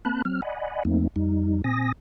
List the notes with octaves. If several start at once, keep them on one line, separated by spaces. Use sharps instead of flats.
A#3 C4 A5 B5 F#6
F#3 C4 F6
D5 D#5 F#5 G#5 B5
E2 F3 A3 A#3 C4 D#4
F2 G3 D#4
A#2 C4 G#5 D#6 A#6